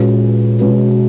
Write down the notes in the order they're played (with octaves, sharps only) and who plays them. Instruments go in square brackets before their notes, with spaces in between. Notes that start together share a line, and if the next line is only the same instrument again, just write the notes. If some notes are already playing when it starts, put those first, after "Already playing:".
Already playing: [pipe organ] A#2 [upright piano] G#3 C#4 F#4 B4
[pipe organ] B2 [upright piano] G#3 C#4 F#4 B4